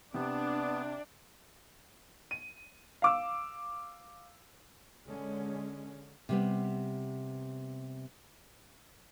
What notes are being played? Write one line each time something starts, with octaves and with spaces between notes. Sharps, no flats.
C3 B3 D4
D#7
F5 D6 E6
D3 G#3 C#4
C3 G3 B3